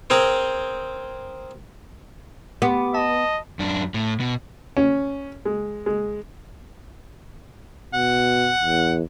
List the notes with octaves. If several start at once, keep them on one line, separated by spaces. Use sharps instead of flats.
C4 G#4 A#4 C5
B3 G4 D6
D#5 A5
F#2 D4
A2
B2
C#4
G#3
G#3
B2 F#5
E2